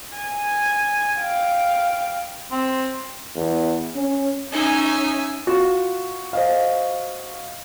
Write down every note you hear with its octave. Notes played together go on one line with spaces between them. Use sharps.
G#5
F5 G5
C4
E2
C#4
C#4 D#4 E5 G#5
F4 F#4
C5 D#5 F5